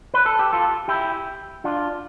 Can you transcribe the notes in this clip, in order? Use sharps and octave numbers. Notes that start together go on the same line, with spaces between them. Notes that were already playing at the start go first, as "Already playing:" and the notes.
B4
A4
G4
F4 A4
E4 G4
D4 F4